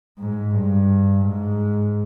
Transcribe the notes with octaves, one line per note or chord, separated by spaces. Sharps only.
G#2
G2
G#2